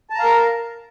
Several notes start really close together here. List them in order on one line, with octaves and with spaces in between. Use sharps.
A5 A#5 F5 A#4